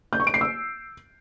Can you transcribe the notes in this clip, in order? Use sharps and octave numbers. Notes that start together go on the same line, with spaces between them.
G6
C#6
D7
C7
E6